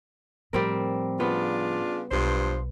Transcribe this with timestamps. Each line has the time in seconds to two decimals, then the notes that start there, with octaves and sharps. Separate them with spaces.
0.53 A2 F3 G3 C4 A#4
1.20 C#3 B3 D4 F4
2.11 B1 G2 F3 C5